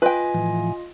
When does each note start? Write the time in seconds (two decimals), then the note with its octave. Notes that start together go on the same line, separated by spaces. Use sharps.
0.02 F4 B4 D#5 G5 G#5
0.34 A2 E3 F3